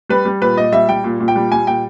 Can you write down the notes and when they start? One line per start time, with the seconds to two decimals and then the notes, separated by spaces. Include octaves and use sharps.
0.09 G3 B4
0.25 G3
0.41 A#2 B4
0.57 A#2 D#5
0.72 G3 E5
0.89 G3 G5
1.04 A#2
1.20 A#2
1.28 G5
1.36 G3
1.51 G3 G#5
1.67 A#2 G5